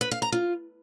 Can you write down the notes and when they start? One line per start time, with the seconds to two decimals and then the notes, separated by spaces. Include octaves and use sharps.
0.01 B4
0.11 F5
0.22 A#5
0.32 F4